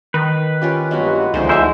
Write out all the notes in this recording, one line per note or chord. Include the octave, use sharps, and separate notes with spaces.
D#3 B4
C#4 F4 G4
G2 F#3 G#3 A#3 B3 F#4
C#2 D3 E3 F3 D#4 G#4 C5
D2 F#3 G#3 E4 C5 D#5 E5